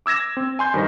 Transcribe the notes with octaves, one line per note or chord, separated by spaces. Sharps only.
D6 E6 G#6 A#6 E7
C4
G#5 C6 G6
G2 D#3 C5 A#6